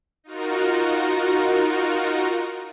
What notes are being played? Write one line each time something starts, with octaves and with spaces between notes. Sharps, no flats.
D#4 F4 F#4 A#4